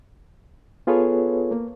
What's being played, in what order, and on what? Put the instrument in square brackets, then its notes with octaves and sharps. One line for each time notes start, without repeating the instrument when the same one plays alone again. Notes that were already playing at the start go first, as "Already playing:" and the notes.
[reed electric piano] B3 F4 G#4 A4 B4 C#5
A#3